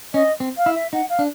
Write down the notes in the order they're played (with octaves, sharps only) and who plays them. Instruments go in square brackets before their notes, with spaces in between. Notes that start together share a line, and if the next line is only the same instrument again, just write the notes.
[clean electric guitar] C#4 [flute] D#5
[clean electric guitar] C4
[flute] F5
[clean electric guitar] E4
[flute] E5
[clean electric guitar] D#4 [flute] F#5
[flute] F5
[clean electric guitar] D4